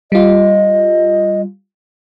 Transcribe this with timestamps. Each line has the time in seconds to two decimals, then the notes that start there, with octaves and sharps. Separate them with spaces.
0.12 G3 F4 D#5